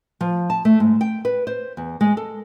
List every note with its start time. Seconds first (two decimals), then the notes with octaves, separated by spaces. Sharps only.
0.21 F3
0.50 A5
0.65 A3
0.80 G#2
1.01 G5
1.25 B4
1.47 C5
1.77 E2
2.01 G#3
2.17 A4